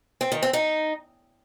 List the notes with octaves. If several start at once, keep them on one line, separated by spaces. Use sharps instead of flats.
C4
D#3
C4
D#4